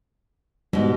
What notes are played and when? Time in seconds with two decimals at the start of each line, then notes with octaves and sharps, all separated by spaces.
0.73 G#2 B2 G3